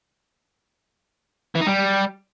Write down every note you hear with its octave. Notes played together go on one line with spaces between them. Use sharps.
E3
D#4
G3